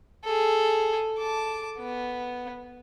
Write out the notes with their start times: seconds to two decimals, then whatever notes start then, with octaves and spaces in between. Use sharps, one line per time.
0.24 G#4 A4
1.18 A5 D6
1.79 B3